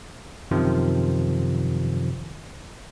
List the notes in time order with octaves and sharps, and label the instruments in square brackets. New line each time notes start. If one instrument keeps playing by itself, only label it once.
[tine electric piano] F#2 C3 D#3 F3